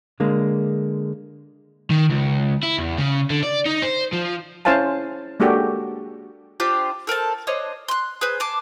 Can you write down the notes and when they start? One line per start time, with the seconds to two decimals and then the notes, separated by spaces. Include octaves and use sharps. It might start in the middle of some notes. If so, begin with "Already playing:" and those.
0.20 D3 G#3 A#3
1.91 D#3
2.10 C#2
2.63 E4
2.79 E2
2.98 C#3
3.30 D3
3.43 D5
3.66 D#4
3.82 C5
4.13 F3
4.65 C#4 E4 C5 F5 G#5 A5
5.40 G#3 A#3 D4 F#4 G4 A4
6.60 D4 F4 G4 C5
7.07 A4 A#4 C5 A5
7.47 D4 C5 C#5 D#5
7.88 C6 F#6
8.21 G#4 B4 C5
8.40 G#5 A5 C6 D6